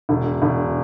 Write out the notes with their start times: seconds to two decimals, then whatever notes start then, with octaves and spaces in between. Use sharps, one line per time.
0.09 E1
0.42 E1